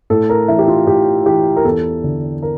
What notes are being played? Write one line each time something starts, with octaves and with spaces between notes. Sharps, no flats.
A2 A4
A#4
E3 E5
G4
F4
A2 G4
E3 G4
A#4
E2 A4
D3
A#4